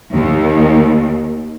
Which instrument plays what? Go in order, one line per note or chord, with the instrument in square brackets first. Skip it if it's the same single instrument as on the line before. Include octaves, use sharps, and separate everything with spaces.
[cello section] D#2